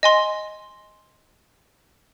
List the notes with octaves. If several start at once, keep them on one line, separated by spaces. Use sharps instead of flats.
D#5 G#5 C6